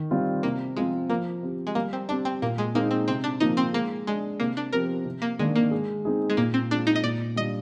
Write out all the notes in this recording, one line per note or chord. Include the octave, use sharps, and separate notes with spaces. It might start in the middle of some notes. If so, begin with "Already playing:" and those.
Already playing: D#3
G3 C4 F4
C3 A#3
F3 G#3 C4 F4
F3 A#3
C4 G4
G#3
G3 A#3
C4
C4 D4 G4
C4
A#2 A#3
G#3
G#3 A#3 C4 D#4
C4
C3 C4
D4
F3 A#3 D#4
C4
G#3 A#3
G#3 D4 G#4
C3 A#3
D4
F3 C4 G4 A#4
C3
A#3
D#3 G#3 A#3 D4
A#3
G#3
C4 D#4 G#4
G#3
A#2 A#3
C4
G#3 C4 D4 F4
D#4
D#5
A#2 D5
G3 D4 F4 D#5